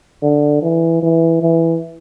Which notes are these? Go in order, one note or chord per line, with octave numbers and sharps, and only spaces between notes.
D3
E3
E3
E3